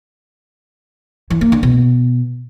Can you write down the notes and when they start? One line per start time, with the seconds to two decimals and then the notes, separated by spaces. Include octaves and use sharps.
1.30 E3
1.41 A#3
1.52 D3
1.63 B2